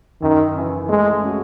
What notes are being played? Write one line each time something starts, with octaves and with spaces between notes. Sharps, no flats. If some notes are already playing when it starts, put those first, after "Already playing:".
F#2 D#3
C#3 E3
G#3 A3
C#4 F#4